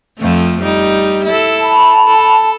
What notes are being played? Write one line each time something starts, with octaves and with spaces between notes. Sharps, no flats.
F2 F3 A3
G3 D#4
E4 A4
A5 B5
A4